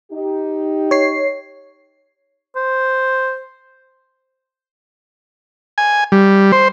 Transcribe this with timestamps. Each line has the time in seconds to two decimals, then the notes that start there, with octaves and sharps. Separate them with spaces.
0.12 D#4 G4
0.91 C#5 C7
2.56 C5
5.78 G#5
6.12 G3
6.52 C5